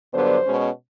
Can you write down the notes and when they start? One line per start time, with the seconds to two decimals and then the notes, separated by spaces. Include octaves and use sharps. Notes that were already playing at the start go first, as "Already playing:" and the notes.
0.13 G2 D3 F#3 B3 D4 C5
0.45 B2 G#3 C#4